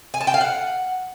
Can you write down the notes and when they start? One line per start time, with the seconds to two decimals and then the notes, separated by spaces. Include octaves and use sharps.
0.14 G#5
0.20 A5
0.27 G5
0.34 F5
0.41 F#5